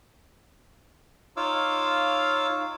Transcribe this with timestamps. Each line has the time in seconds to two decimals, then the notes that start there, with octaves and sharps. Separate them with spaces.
1.37 D#4 F4 C#5 F5 D6 E6